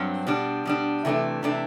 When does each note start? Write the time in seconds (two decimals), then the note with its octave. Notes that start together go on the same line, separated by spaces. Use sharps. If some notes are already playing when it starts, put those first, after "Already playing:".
Already playing: G2 F#3 C4
0.27 B2 G3 D4
0.65 B2 G3 D4
1.05 C3 E3 A3 D4
1.43 C3 E3 A3 D4